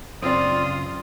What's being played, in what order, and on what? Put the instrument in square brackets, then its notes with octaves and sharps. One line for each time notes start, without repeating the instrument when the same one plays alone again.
[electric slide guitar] F#2 C#3 [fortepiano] C4 D5 [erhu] F4 [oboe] D#6